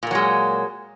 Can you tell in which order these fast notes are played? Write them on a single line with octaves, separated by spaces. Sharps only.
A#2 A#3 F#3 G#3